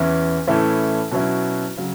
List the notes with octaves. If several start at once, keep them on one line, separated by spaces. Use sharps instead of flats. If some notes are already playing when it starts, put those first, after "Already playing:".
Already playing: E2 E3 C#4 E4
A2 E3 A3 C#4 E4
B2 F#3 C#4 E4
C#3 F#3